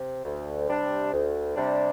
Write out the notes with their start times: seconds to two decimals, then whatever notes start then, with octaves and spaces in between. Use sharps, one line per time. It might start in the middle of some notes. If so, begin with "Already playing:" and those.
Already playing: C3
0.25 D2
0.69 C3 G3 D4
1.13 D2
1.56 C3 G3 D4